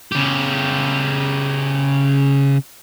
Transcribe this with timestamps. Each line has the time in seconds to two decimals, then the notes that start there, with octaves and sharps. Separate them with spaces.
0.12 C#3 G4